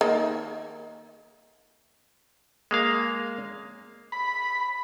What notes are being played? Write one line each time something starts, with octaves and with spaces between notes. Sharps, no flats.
D#3 A#3
G#3 A#3 F5
B5